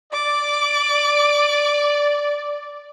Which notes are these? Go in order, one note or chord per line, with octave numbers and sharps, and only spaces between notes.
D5 D6